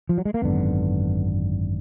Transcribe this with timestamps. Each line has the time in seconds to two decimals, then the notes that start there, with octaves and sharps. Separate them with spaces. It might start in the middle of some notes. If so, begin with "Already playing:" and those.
0.09 F3
0.18 F#3
0.25 G#3
0.34 A#3
0.42 G#1 F#2 D3 B3